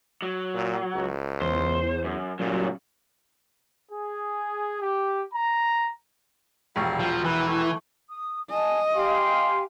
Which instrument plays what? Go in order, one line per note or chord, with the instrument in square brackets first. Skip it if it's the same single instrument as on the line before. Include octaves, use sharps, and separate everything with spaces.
[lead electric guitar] F#3
[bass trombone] A#2
C#2
[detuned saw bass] E2 [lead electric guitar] C5
[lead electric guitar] F#2
[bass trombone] A#2 [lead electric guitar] C#3 G3 [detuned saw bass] F#3
[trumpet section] G#4
G4
A#5
[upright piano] E1 A#1 C#6 [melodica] G3 F5
[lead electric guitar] F3
[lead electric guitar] E3 [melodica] B4
[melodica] A3 [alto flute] E4
[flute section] D#6
[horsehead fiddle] D#5 [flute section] G#5 A5
[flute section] G4 F5 G#5 [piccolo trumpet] C6